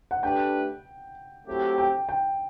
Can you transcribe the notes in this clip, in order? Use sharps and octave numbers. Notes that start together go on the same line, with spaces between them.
F#5
A3 D4 G4 B4 G5
F#3 A3 C4 E4 G4
G5
G5